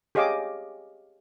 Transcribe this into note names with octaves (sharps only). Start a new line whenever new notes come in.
G4 G#4 C#5 D#5 F5 D6